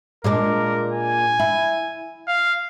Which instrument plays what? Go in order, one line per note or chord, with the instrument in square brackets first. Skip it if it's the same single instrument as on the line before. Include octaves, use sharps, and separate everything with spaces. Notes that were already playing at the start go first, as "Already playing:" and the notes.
[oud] A#2 G#3 D4 [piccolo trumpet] A#4
[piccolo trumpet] G#5
[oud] E4
[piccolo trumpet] F5